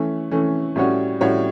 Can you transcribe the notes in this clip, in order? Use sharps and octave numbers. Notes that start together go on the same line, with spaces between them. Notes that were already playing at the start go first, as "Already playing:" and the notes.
Already playing: E3 A3 C#4
E3 A3 C#4
A2 G3 C#4 F#4 C#5
A2 G3 C#4 F#4 C#5